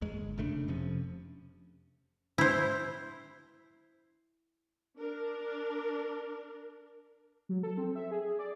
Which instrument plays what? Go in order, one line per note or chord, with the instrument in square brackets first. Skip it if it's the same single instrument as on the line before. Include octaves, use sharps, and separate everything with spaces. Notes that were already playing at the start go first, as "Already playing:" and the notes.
[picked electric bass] A1 E2 G#3
G1
F1 C#3 A3 D4
F2 C3 F3 C#4
[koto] E4 C5
[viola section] D4 A#4
[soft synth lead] F#3
A4
C4
E5
G#4
D5